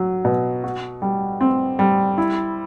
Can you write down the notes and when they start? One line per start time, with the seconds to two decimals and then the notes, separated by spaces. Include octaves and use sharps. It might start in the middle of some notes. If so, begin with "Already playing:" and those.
Already playing: F#3
0.25 B2
0.64 F#4
1.02 G3
1.41 C4
1.79 G3
2.18 E4